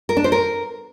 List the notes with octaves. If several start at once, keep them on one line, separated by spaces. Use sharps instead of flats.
A#4
D4
C5
A#4